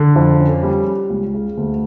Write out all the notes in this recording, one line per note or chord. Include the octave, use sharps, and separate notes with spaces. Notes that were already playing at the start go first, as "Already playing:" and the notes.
Already playing: D3
F2
C#4
G3
G3
C#2
C#3
D2